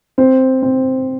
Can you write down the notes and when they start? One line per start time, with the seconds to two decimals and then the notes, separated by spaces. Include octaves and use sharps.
0.18 C4
0.62 C4